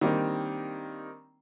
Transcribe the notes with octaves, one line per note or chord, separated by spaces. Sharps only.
D#3 G3 A#3 C4 D4 D#4